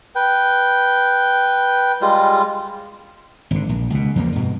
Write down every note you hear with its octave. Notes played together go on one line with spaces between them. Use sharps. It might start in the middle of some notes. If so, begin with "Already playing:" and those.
B4 G5
G3 G#3 F4
G#1 D3
A#1
C#2 B2
E2 F3 A#3
G2 B2